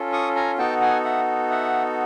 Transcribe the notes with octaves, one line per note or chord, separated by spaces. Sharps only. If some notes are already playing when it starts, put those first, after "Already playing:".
Already playing: C#4 F4 A4
C#6 D#6
G#5 A#5
B3 D#4 F#4 A4 G5 A5
F#5 G#5
E5 F#5
E5 F#5